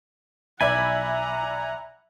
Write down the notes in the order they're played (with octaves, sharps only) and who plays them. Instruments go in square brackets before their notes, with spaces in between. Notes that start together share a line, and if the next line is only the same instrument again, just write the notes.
[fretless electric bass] B1 [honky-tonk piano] D5 E5 B5 [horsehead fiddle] F#5 A#5 [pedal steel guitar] G#5